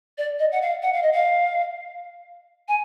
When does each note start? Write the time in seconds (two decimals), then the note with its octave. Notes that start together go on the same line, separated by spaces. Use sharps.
0.18 D5
0.39 D#5
0.52 F#5
0.62 F5
0.82 F#5
0.93 F5
1.02 D#5
1.12 F5
2.68 G#5